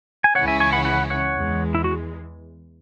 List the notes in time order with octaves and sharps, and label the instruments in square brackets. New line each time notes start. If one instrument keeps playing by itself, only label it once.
[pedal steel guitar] G#5
[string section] C#2 C#3 E3 C#4 E4 [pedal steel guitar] C#5 F#5
[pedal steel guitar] E5 G#5
G#5 C#6
F#5 B5
F#5 B5
C#5 F#5
[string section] E2 E3 G#3
[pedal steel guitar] E4
F#4